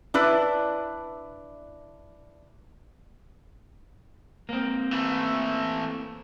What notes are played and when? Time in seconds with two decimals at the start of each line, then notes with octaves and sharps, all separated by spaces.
0.14 D4 E4 B4 D5
4.49 A#3 C4
4.93 E3 A3